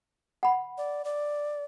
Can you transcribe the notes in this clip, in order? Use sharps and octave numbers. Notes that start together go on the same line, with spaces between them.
F#5 B5
D5
D5